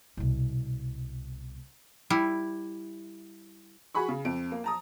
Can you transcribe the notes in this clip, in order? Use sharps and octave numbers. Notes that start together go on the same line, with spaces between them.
C2 B2
G3 E4
F#4 G#4 B5 C#6
C#3
F2 D7
A#3
A5 A#5 D#6